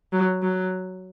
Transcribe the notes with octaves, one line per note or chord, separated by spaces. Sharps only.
F#3
F#3